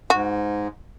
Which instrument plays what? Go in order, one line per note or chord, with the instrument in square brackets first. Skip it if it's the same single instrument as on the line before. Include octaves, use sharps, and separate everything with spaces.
[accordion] G#2 [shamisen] F#4